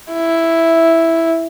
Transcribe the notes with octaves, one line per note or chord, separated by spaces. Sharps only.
E4